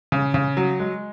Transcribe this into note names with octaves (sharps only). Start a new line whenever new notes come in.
C#3
C#3
F#3
G#3